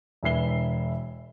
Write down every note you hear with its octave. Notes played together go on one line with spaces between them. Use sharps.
E1 E3 E5 C7 G7